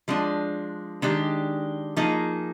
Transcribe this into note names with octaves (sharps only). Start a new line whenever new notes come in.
F3 G#3 D4
D#3 G#3 D4 G4
F3 A#3 D#4 G#4